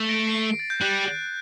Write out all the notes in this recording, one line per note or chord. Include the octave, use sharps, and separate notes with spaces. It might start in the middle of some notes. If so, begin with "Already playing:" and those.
Already playing: A3
A#6 D7
C7
A6
G6
G3 F#6